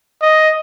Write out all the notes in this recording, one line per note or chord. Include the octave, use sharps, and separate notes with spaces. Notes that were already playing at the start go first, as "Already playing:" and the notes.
D#5